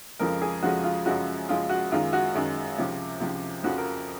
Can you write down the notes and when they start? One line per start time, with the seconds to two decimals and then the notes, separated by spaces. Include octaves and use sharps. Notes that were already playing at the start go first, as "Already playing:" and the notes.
0.19 F2 C#3 F3 G#3 A#4
0.42 G#4
0.62 F2 C#3 F3 G#3 F#4
0.84 F4
1.06 F#2 C#3 F3 G#3 F#4
1.49 F#2 C#3 F3 G#3 F4
1.69 F#4
1.91 F#2 D#3 G#3 F4
2.13 F#4
2.34 F#2 D#3 G#3
2.78 C#2 C3 F3
3.20 C#2 C3 F3
3.63 F2 C#3 F3 F#4
3.78 A#4